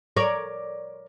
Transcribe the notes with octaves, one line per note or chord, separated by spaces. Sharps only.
A#4 C#5 D5